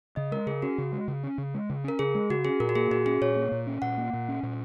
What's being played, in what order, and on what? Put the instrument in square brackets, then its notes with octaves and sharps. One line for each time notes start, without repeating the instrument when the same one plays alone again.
[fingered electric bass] C#3 [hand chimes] D#5
[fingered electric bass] G#3 [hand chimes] A#4
[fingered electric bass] C#3 [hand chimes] G#4
[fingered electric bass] C#4 [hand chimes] F#4
[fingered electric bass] C#3
G#3
C#3
C#4
C#3
G#3
C#3
[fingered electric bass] C#4 [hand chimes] A#4
[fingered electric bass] C#3 [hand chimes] G#4
[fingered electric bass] G#3
[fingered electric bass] C#3 [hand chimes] F#4
[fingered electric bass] C#4 [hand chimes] G#4
[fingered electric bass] A#2 [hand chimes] A#4
[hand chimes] F#4
[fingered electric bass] A#3 [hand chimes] G#4
[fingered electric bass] A#2 [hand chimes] F#4
[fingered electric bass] C#4 [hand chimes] G#4
[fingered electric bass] A#2 [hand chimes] C#5
[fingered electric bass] A#3
A#2
C#4
[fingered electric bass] A#2 [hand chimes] F#5
[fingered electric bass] A#3
A#2
C#4
A#2